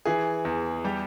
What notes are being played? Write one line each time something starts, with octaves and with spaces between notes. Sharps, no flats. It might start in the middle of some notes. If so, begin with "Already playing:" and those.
E3 G#4
E2
G3 G4